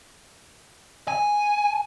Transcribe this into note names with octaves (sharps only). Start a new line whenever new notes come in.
G#5